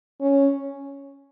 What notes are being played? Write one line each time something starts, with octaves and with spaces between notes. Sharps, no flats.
C#4